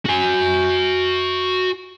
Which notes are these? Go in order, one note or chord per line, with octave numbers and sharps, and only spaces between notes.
F#4 G#5